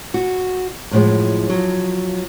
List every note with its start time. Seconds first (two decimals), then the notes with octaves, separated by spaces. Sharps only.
0.14 F#4
0.91 F#2 A2 D3 F3 G#3
1.49 F3 F#3